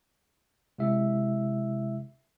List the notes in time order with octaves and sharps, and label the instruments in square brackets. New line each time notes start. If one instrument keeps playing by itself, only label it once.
[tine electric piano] C3 G#3 E4 E5